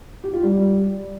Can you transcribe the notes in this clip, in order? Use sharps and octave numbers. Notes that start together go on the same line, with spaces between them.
G4
F4
G3